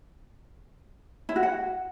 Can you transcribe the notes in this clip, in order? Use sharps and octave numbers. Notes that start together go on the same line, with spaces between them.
E4
F#4
F#5